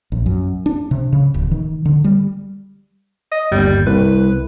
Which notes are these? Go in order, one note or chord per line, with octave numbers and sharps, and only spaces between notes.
A#1
F#2
D4
C3
C#3
D1
D#3
D3
G3
D#5
G1 D#2 G3
C2 B4